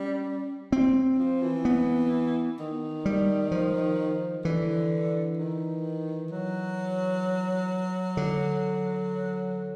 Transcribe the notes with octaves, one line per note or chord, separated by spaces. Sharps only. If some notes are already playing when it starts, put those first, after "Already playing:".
Already playing: G3 C#4
C4
F3
E3
B3
D#3
G3
F3
D3 E3
D#3
F#3
D3